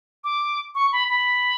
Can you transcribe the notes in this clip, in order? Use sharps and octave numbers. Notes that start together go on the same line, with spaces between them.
D6
C#6
B5
B5